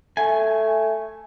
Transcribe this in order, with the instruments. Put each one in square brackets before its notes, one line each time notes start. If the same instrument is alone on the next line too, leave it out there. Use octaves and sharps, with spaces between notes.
[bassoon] A3 [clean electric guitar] G#5